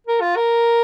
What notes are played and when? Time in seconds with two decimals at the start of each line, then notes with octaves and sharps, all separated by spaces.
0.07 A#4
0.21 F4
0.36 A#4